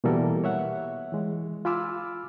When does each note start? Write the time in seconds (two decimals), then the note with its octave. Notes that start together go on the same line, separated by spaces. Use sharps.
0.04 B2 E3 G3 A#3 A4 A#4
0.44 C#5 E5 F#5
1.12 E3 G#3
1.65 F4 G#5 B5 D6 E6 F6